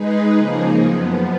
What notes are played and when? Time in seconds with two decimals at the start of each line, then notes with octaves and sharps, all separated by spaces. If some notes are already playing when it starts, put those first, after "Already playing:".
Already playing: G#3 D#4 G#4 B4
0.37 C#3 F3 A#3 D#4 G#4
0.83 F#2 F3 B3